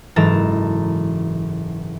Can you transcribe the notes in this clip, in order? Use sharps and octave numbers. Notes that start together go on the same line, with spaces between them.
F#1 G#2 E3 A4 A5 A#5